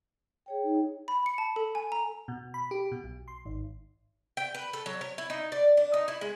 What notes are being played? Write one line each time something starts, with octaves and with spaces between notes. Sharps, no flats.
G#4 C#5 G5
D#4
B5
C#7
A5
A4
G#5
A#5
B2
B5
G4
B2
B1
C6
G#1
G5
B4
A4
F#3
C#5
E4
D#4
D5
D4
D#4
E4
G#3